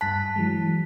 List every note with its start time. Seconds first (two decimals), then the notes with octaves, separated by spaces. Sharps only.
0.01 G2 A5 F#6 B6
0.36 E3 F#3 G#3